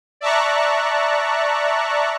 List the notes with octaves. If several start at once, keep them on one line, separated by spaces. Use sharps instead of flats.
D5 E5 A5 A#5 C#6 F#6